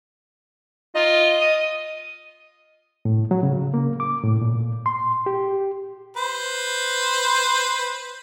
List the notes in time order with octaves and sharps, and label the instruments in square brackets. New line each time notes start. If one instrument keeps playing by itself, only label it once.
[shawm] F4 [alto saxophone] D#5
[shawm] D#6
[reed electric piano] A2
F#3
C#3
A#3
D6
A2
A#2
C6
G4
[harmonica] B4 C5